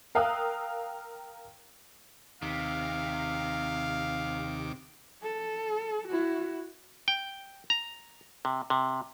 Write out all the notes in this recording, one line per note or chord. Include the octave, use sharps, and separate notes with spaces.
A#4 F5 G5 D#6 E6 F#6
D#2 C3 D#3 F5 D6
A4
E4 F#4
G5
A#5
C3
C3